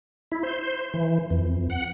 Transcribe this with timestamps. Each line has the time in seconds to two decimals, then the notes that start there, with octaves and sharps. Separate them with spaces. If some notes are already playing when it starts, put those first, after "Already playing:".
0.32 E4
0.43 C5
0.94 E3
1.30 F2
1.70 F#5